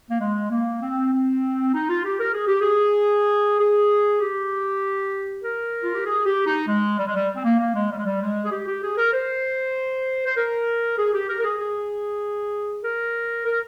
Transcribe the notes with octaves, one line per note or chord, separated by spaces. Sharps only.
A#3
G#3
A#3
C4
C4
D#4
F4
G4
A#4
G#4
G4
G#4
G#4
G4
A#4
F4
G4
G#4
G4
D#4
G#3
G3
G#3
G3
C4
A#3
A#3
G#3
G3
G#3
G3
G#3
G#4
G4
G4
G#4
A#4
C5
C5
A#4
G#4
G4
A#4
A#4
G#4
G#4
A#4
A#4